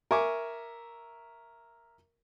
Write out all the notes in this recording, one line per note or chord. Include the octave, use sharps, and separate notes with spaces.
A#4 E5 G#5 C#6 D6